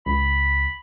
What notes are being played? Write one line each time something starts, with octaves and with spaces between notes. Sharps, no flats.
C#2 B5